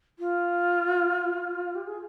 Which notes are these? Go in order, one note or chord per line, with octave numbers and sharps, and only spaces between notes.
F4
G4
G#4